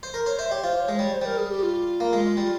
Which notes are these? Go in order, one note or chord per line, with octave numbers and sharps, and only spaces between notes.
C5
A#4
C5 C#5
C5 E5
G4 C#5
F4 C5
C#5
G#3
G3 C#5
C5
G3 A#4
G#4
G4
F4
A#3
G#3
G3